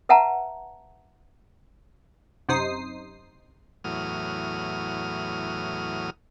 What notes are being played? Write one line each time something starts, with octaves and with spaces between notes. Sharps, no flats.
B4 E5 F#5 A5 A#5
F#2 C3 D#4 C5 D#6 C7
E2 A2 F#3 D#6 F6